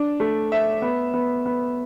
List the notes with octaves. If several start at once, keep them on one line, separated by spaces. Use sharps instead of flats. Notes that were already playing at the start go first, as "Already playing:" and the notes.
Already playing: D4
A3
E5
B3
B3
B3